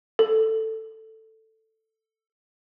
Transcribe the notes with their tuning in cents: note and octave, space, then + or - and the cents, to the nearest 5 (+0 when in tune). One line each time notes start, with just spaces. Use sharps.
A4 +5